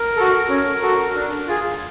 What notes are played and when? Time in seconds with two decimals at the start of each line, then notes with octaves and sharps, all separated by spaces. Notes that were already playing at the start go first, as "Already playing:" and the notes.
Already playing: A#4
0.16 F#4 A4
0.49 C#4
0.82 F#4 A4
1.15 D4
1.48 F4 G#4